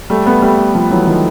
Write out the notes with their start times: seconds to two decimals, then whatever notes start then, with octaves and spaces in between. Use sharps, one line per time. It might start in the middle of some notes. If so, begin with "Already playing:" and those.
0.10 G3 A3
0.26 A3 B3
0.42 G3 A3
0.74 F3 G3
0.91 E3 F#3
1.07 D#3 F3